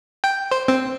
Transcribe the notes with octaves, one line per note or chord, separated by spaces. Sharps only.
G5
C5
C4